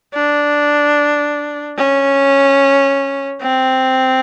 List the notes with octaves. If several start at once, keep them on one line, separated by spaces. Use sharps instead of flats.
D4
C#4
C4